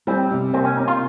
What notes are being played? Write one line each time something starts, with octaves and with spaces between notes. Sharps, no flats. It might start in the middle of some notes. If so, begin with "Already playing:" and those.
G3 C4
C3
A#3 C4
C#4
C3 D#4
F4